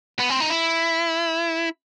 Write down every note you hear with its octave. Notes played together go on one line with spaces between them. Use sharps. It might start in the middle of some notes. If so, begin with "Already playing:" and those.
B3
C4
D#4
E4